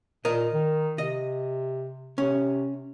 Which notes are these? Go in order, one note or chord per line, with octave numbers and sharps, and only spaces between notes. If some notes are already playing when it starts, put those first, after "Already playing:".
A#2 A#4 D#5
D#3
C3 D#5
C3 C#4